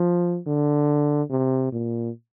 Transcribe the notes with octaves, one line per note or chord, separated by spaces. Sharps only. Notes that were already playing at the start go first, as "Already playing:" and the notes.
Already playing: F3
D3
C3
A#2